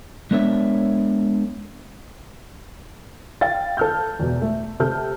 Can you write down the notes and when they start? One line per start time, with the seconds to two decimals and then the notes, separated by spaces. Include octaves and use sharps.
0.31 G#3 B3 D4 A#4 C#5 E5
3.41 F5 G5 A6
3.77 A4 F6 G6
4.19 E2 B2
4.42 A3
4.80 C3 A4 F6 G6